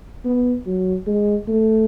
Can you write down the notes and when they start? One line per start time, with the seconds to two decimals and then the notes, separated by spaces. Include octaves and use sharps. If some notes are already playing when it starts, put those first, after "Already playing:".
0.24 B3
0.66 F#3
1.07 G#3
1.48 A3